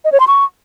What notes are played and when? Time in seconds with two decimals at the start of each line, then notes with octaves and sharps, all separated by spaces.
0.05 D#5
0.12 C#5
0.20 C6
0.27 C#6